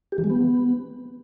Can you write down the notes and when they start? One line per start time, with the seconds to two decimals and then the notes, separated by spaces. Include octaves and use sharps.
0.12 G4
0.18 E3
0.24 G#3
0.30 B3